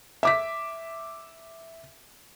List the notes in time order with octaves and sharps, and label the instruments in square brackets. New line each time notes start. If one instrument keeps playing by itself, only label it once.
[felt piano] E5 D6 B6